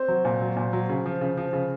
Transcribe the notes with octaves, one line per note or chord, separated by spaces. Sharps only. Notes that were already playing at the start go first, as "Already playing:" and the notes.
Already playing: C4 C5
F#3
A#2
F#3
A#2
F#3
C#3
F3
C#3
F3
C#3